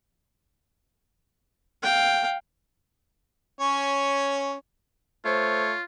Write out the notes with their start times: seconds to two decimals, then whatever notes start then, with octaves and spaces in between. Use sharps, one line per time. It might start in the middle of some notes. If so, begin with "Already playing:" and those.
1.83 F5 G5
3.59 C#4 C#5
5.25 A3 F4 C5 C#5